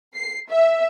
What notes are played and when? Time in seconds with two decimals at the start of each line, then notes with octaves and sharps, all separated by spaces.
0.15 C7
0.51 E5